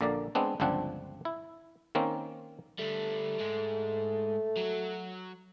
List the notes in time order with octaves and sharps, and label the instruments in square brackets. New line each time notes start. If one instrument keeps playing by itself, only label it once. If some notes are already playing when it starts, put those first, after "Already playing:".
[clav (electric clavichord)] A#1 D3 A#3 D5
G#3 B3 C4 D4
G1 C#2 F3 C4 D4 F#5
E4
D#3 A#3 C4 C#4
[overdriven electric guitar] D3 G3 [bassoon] A3
[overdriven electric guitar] G#2 G#3
F#3 F#4